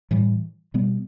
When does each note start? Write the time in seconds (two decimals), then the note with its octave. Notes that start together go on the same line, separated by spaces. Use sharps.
0.11 A2 E3 G3
0.74 B2 G3 B3